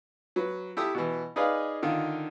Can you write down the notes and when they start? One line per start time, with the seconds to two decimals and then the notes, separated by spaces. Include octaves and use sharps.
0.36 F#3 B4
0.77 E4 G4 A4 D#6 E6
0.94 B2 E3
1.36 D#4 G#4 B4 D5 D#5 F5
1.83 D3 D#3 F4